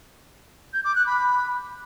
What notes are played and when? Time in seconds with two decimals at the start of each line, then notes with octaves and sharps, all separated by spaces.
0.74 G6
0.85 D6
0.96 F#6
1.07 B5